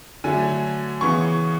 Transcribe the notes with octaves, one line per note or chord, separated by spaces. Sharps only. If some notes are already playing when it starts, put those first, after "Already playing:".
D3 F#3 A3 G#5
C#3 E3 B3 C#6